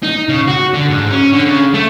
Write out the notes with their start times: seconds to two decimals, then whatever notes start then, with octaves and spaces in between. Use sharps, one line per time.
0.03 D#4
0.29 C#3
0.48 F#4
0.74 D3
0.90 G#2
1.10 C#4
1.32 D3
1.45 C#3
1.74 A3